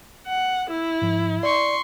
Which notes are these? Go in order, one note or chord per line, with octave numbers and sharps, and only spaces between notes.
F#5
E4 E6
G#2 F3
D5 C6 C#6